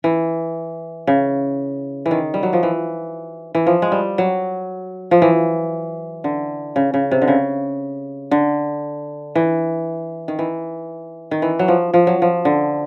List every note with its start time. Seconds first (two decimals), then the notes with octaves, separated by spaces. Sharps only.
0.04 E3
1.07 C#3
2.06 E3
2.11 D#3
2.34 G3
2.43 F#3
2.53 F3
2.63 E3
3.55 E3
3.67 F3
3.82 G#3
3.92 G3
4.18 F#3
5.11 F3
5.22 E3
6.24 D3
6.76 C#3
6.94 C#3
7.11 C3
7.22 D3
7.28 C#3
8.31 D3
9.35 E3
10.28 D#3
10.39 E3
11.31 D#3
11.42 E3
11.59 F#3
11.68 F3
11.94 F3
12.07 F#3
12.22 F3
12.45 D3